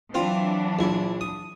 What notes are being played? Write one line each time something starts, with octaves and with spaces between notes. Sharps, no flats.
E3 F#3 C4 D4 F4
A#1 E4
D#6